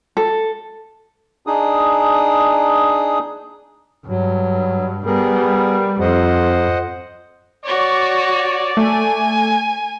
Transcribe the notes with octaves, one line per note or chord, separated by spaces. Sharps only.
A4
D4 D#4 G#4 D#6
G2 F#3
G3 B3 G#4 A#4
F2 C5 D#5 F#5
F#4 C#5 D5
A3 G#5